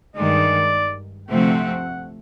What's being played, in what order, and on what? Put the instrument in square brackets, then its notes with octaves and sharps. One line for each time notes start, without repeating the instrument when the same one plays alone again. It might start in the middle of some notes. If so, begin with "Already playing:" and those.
[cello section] G2 D#3 G#3 [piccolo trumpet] D5
[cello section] D2 C3 F3 A3 C4 [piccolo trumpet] F#5